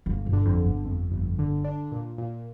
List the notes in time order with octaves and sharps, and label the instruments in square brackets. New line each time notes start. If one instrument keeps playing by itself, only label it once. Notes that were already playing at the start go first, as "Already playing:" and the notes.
[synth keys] G1 [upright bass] A#3
[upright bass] G2
[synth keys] D3
[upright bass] F2
[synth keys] G1
[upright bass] G2
[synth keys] F2
G1
D3
D4
A#2
A#2